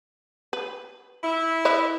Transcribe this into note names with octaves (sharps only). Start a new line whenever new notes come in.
B4
E4
B4 D#5 E5